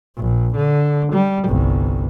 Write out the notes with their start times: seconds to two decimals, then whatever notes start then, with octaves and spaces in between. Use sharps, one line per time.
0.17 A#1
0.56 D3
1.13 G3
1.47 G1 C2